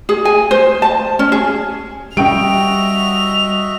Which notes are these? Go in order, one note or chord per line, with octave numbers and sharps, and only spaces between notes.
G#4
G#5
C5
A5
C#4
G#4
G3 F#4 D#5 E5 G5 D7 F7